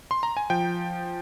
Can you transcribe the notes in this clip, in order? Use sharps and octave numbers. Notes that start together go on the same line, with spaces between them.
C6
A#5
G#5
F3 G5